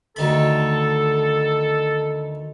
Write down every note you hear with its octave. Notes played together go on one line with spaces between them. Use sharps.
D2 D#3 A4 B5